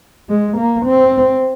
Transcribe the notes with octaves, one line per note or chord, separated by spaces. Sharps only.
G#3
A#3
C4